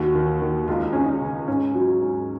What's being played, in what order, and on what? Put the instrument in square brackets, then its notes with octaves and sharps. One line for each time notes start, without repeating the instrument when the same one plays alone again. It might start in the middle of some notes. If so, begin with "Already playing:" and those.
Already playing: [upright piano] D#2 F#4
D#3
D#3
C#2 F4
D#4
C#2 C#4
D#4
C#3
G#2 C#4
F#3
G#2